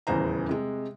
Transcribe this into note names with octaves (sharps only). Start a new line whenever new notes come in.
D#1 E2 C#3 E3 C5 A#5
C3 G#3